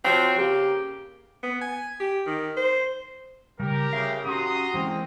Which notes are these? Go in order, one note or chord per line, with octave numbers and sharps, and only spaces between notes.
F3 C4 F#4 C#5
C#3 A#3 G4
B3
G#5
G4
D#3
C5
C#3 G3 G4 A#4
C#3 G#4 E5 F5
C#4 F#4 G4 A#5 C6 D#6
E3 G#3 A#3 C4